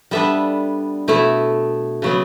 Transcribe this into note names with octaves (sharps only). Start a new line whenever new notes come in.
G3 B3 D4 A4 E5
B2 A3 E4
C#3 F#3 B3